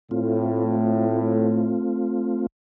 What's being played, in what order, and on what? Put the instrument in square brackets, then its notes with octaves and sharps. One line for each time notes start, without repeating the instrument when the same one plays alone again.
[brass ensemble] A2 [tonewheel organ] A3 C4 F4